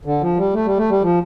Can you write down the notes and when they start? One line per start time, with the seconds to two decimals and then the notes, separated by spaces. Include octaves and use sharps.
0.05 D3
0.21 F3
0.37 G3
0.54 A3
0.65 G3
0.77 A3
0.90 G3
1.02 F3